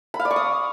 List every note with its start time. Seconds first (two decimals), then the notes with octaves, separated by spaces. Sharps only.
0.14 B5
0.20 F5
0.25 D5
0.31 C#6
0.36 D#6